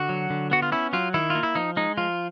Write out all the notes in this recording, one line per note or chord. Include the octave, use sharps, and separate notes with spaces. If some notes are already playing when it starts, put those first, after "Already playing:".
Already playing: D3 F#4
F#3
D3
B3 F#4
F4
C#4 E4
F#3 F4
D#3 E4
F4
A#3
E4
F3 D#4
G#3 D#4
F3 F4